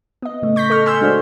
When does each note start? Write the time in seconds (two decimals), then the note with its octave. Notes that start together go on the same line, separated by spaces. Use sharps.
0.22 B3 D#5
0.42 A2 C#3 A3
0.56 C#6 G6 A#6 B6
0.70 A4 D#5 C#6 F6
0.86 G#5 C6 C#6 E6 F6 G6
1.01 G#3 D4 F#4 C5 D5